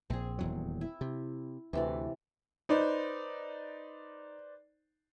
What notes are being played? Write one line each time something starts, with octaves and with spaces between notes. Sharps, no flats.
A#1 C4 G#4
D#1 E2 F#3
E4
C3
D2 C3 E3 D5
D#4 B4 C5 D5